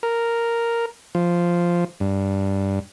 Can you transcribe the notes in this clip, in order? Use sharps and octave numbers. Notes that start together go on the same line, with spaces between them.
A#4
F3
G2